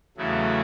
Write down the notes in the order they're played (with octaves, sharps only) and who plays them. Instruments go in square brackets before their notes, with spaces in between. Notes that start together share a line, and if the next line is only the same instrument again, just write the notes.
[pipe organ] E2 C#3 F#3 A3 E4